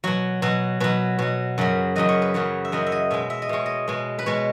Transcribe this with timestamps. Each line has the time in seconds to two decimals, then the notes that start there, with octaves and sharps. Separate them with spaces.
0.04 B2 F#3 F#4
0.42 B2 F#3
0.80 B2 F#3 B4
1.19 B2 F#3
1.58 F#2 C#3 F#3
1.96 F#2 C#3 F#3 D#5
2.09 C#5
2.22 B4
2.34 F#2 C#3 F#3 C#5
2.65 E5
2.72 F#2 C#3 F#3 D#5
2.87 E5
2.92 D#5
3.11 B2 G#3 E5
3.30 E5
3.42 D#5
3.49 B2 G#3 C#5
3.66 D#5
3.88 B2 G#3
4.19 B4
4.26 B2 G#3 C#5